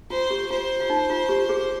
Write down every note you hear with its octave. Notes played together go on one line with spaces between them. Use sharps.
F4 C5
G4
F4 C5
F4
D#4
F4
G4
G#4